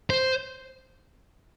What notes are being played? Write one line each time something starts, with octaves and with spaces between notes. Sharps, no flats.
C5